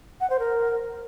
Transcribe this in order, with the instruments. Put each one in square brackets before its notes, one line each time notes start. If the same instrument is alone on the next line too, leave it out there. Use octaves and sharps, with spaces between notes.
[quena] F#5
C5
A#4